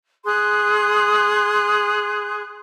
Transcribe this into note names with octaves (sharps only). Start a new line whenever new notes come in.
G#4 C6 D#6 F#6